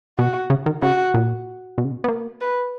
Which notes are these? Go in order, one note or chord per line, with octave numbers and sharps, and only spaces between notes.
B2 F#4
C#3
D#3
C#3 F#4
A#2
B2
C#3
B2
B3
A#3
B4